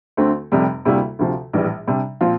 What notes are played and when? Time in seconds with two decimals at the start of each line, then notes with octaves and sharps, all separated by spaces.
0.17 D2 D3 A3 C4
0.52 F1 F2 C3 G3
0.85 D2 C3 G3 A#3 E4
1.19 D2 C3 F3
1.53 A#1 A2 E3 G3
1.87 C3 G3 D4
2.21 A#2 F3 C4 F4